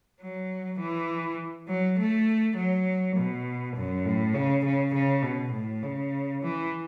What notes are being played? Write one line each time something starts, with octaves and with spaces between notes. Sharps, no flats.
F#3
E3
F#3
A3
F#3
B2
F#2
A2
C#3
C#3
C#3
B2
A2
C#3
E3